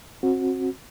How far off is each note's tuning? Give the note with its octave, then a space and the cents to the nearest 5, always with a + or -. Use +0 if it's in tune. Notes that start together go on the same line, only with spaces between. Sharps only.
C4 +30 F#4 -15